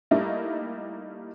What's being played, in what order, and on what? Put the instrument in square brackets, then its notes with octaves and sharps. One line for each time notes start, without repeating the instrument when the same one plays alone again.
[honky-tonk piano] G3 A3 A#3 D#4 E4